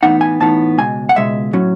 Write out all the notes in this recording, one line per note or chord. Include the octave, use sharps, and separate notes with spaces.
A2 E3 B3 D#4 F#5
G#5
A2 E3 B3 D#4 A5
C#2 B2 G#3 G#5
F#5
C#2 B2 G#3 E5
A2 F#3 C#4